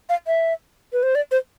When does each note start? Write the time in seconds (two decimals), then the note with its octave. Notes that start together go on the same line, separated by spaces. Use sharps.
0.09 F5
0.27 E5
0.93 B4
1.03 C5
1.15 D5
1.31 C5